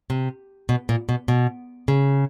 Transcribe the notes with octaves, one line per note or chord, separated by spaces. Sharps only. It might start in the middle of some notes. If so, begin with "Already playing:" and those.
C3
B2
A#2
B2
B2
C#3